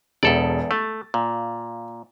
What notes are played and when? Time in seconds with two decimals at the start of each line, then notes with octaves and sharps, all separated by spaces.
0.23 E1 E2 A4 D5
0.71 A3 A6
1.14 A#2